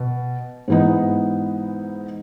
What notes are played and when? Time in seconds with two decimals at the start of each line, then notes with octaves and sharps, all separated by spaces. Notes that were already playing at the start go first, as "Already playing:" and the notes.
Already playing: B2
0.68 G#2 E3 B3 D#4